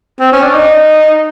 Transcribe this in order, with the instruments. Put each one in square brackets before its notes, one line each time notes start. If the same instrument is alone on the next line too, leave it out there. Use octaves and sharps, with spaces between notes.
[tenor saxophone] C4
C#4
D4
D#4